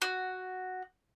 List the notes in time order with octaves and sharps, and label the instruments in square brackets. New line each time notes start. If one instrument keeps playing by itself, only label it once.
[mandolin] F#4